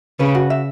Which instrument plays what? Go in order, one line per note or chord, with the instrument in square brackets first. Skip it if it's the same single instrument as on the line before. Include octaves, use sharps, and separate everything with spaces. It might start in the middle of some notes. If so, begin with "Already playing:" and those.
[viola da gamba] C#3 [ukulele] B4
[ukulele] F#4
E5